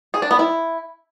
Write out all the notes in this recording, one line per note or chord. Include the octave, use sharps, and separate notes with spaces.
G#4
D4
B3
E4